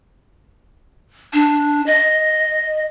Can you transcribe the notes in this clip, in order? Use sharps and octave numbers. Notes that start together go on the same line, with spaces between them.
D4
D#5